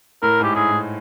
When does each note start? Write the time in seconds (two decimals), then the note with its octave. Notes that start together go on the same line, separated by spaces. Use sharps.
0.23 A2 A#4
0.40 G#2 G4
0.56 A2 G#4
0.72 A2